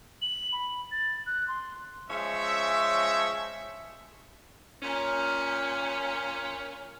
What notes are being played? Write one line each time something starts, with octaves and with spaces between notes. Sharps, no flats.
F#7
B5
A6
F#6
C6
F3 G#3 C#4 C#5 E5
A#2 C#4